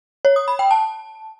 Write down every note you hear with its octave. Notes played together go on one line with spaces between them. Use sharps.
C#5
D#6
B5
G5
A5